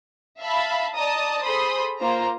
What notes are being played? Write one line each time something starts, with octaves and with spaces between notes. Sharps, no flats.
E5 F5 A5 B5
D5 D#5 A5 A#5 D#6
G#4 A4 C5 B5 C6 D#6
A#3 F4 C5 A#5